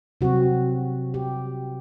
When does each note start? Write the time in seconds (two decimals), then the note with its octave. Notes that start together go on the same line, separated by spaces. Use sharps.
0.21 C3 F#3 C4 F#4
1.14 G4